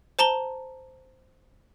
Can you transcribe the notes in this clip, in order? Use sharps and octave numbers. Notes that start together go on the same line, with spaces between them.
C5 A5 A#5 G7